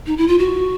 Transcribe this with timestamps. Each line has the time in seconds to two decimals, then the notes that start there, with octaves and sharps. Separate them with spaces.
0.06 D#4
0.17 E4
0.28 F4
0.39 F#4